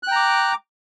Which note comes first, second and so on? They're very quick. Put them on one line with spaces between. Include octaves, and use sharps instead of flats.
F#6 G5 A#5 D6